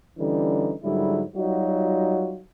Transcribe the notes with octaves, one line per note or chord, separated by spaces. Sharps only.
D3 E3 G3 C#4 D#4
G#2 D3 F#3 G3 E4
F#3 G3 D#4 F4 F#4